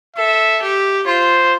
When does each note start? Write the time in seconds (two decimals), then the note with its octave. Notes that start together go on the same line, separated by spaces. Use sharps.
0.16 A4 E5
0.62 G4
1.07 F4 C5